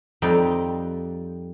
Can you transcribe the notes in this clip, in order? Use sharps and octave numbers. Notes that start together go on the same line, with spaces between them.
F2 G3 C4 D#4 G5 A5